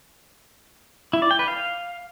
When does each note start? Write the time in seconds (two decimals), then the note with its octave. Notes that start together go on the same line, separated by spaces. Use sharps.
1.13 E4
1.22 D5
1.31 G5
1.39 B4
1.48 F5